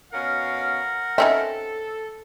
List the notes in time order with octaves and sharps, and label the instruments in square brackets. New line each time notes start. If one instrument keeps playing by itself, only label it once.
[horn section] B2 C#4 F5 [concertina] A#4 F#5
[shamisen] C4 C#4 D#4 [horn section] A4 [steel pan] E5